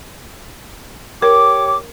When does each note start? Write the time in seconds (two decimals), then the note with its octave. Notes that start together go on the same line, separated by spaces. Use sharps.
1.22 G4 A#4 C#5 D6